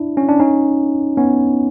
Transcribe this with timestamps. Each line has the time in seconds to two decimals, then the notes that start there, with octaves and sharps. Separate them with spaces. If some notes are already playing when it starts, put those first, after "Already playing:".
Already playing: D4 E4
0.17 C#4
0.29 D4
0.40 C#4 D#4
1.17 B3 C#4